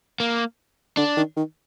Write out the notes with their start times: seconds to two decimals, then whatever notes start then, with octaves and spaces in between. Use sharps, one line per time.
0.20 A#3
0.97 D3 D4
1.17 D#3
1.37 D#3